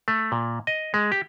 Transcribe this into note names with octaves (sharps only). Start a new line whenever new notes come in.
A3
A#2
D#5
G#3
G4